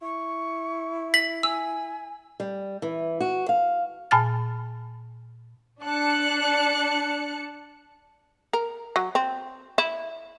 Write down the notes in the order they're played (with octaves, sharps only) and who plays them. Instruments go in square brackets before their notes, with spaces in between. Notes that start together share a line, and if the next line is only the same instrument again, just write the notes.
[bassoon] E4 [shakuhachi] C#6
[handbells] B6 [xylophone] F#7
[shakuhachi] G#5 [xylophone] E6
[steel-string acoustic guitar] G3
E3
F#4
F5
[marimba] A#2 G#5 A5 F6 A6
[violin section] D4 A5 F#6 C#7
[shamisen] A#4
F#3
C4
E4